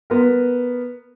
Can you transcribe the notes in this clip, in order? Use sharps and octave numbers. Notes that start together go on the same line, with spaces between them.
B3 A#4